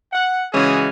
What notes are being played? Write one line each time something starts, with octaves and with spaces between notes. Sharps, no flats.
F#5
C#3 E3 G#3 C#4 F#4 G#4